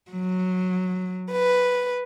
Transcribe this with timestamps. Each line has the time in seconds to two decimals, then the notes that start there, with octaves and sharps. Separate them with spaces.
0.11 F#3
1.31 B4